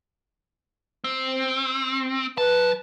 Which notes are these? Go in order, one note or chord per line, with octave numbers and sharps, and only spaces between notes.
C4
F#3 B4 A5